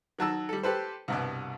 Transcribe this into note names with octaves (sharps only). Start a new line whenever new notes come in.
D#3 F#3 A5 E6
G3 A4
G4 A4 B4 C5
C2 G2 B2